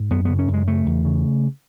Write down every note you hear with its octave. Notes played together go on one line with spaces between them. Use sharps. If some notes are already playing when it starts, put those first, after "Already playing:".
Already playing: G#2
F#2 B3
C#3 B3
C#4
F#2
G#3
C#3 A3
E2
C#3